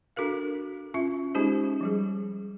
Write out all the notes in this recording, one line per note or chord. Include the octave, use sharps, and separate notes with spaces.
D4 F#4 A4 A#4 F5
C#4 F4 E5
G#3 C#4 D#4 G4 G#4 C5
F3 G3 G#4